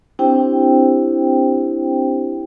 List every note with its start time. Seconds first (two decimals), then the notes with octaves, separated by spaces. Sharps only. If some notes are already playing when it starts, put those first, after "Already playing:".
0.19 C4 D4 E4 G4 C5 G5